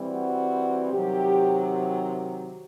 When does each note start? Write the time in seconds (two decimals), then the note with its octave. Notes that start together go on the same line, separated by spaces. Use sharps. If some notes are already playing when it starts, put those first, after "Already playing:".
Already playing: E3 G3 C4
0.11 F#4
0.91 C3 D#3 F#3 G4